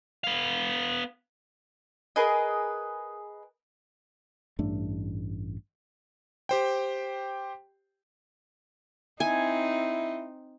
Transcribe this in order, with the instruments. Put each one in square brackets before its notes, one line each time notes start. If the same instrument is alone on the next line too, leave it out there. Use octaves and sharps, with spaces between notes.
[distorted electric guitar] B3 F5
[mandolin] G#4 A#4 B4 D#5
[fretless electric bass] A1 G2 A3 D4
[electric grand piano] G4 C5 G5
[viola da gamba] C4 D#4 [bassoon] E4 [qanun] G#5